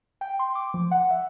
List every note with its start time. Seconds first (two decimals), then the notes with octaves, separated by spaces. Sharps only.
0.21 G5
0.39 C6
0.55 D6
0.74 F3
0.91 F#5
1.11 E5